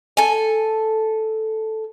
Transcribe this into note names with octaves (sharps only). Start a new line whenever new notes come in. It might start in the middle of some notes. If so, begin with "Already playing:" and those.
A4 G#5